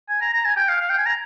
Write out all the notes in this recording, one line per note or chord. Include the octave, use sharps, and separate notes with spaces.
G#5
A#5
A#5
G#5
G5
F5
F5
G5
G#5
A#5